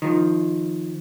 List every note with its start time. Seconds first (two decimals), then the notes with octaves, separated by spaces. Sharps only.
0.02 D#3 F3